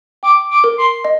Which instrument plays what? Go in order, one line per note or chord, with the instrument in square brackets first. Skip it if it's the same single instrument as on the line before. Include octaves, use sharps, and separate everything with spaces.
[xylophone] G5 [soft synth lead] D6
[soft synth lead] D6
[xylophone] A#4
[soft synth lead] C6
[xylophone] D#5